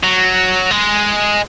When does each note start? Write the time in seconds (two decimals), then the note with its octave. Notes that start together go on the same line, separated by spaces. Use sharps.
0.03 F#3
0.71 G#3